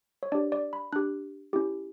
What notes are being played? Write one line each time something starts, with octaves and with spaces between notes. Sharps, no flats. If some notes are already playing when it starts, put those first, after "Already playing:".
C#5
D4 G4 D5
D5
B5
D4 G4 F#6
C#4 E4 G4